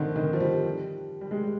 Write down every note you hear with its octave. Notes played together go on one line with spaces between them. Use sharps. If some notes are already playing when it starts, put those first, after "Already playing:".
Already playing: D3 D#3 C4
D#3
F3
G3
G3
G#3
G3